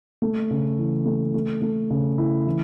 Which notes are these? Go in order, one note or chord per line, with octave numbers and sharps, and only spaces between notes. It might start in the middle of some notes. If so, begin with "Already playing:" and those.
A3
C#3
E3
A3
A3
A3
C#3
E4
E3